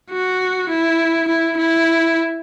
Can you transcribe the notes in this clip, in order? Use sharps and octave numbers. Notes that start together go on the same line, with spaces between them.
F#4
E4
E4
E4